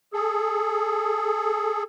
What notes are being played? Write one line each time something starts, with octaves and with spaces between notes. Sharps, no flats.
G#4 A4